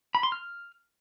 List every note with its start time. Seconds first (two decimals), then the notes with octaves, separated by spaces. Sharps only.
0.15 B5
0.23 C6
0.32 F6